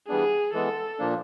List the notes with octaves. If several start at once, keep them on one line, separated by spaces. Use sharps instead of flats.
E3 G3 B3 D4 G#4
E3 G#3 B3 A4
A#2 F3 A#3 D4